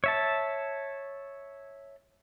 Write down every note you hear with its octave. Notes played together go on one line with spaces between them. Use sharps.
C#5 E5 A5